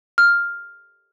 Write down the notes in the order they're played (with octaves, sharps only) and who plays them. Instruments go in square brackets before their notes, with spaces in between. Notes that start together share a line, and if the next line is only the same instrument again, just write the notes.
[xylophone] F6